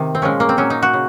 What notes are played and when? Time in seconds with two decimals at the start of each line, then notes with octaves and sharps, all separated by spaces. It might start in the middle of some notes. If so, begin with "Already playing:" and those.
Already playing: C3 D#3
0.15 C4
0.22 A#2 F3 G#3 C#4
0.40 A#3
0.49 C4
0.57 A#2 F#3 C#4
0.70 D#4
0.83 F#4
0.93 C#3